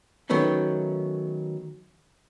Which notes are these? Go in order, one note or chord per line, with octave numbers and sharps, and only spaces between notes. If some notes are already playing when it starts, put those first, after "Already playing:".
D#3 F#3 A3 B3 C#4